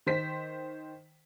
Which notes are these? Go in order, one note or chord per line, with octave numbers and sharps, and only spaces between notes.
D#3 C5 B6